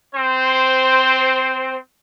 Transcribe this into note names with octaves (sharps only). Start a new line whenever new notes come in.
C4 C5